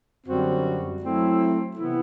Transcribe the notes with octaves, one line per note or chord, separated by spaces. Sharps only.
F#2 D3 G3 C4 F#4
F#3 A3 C4 E4
C3 E3 B3 E4